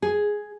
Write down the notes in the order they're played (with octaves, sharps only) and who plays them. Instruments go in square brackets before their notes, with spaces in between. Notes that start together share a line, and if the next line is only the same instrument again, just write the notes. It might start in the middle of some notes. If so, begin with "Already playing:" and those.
[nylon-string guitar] G#4